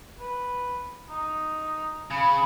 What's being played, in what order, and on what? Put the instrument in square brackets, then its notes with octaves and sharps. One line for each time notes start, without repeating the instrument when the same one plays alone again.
[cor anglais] B4
D#4
[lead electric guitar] C#3 [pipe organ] B5